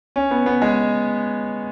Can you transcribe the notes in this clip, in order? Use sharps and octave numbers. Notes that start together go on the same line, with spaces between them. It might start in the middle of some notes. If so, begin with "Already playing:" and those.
C#4
B3
B3
G#3